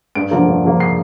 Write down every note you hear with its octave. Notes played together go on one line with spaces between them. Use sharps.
G2 D7
D3 F3 A#3
G2
D3 F3 A#3
C7